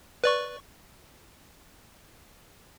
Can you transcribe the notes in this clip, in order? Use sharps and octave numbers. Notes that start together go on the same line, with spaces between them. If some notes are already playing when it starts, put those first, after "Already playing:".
B4 D5 C#6